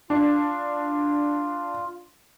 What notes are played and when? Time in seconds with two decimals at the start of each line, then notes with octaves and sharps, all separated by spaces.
0.10 D4 F4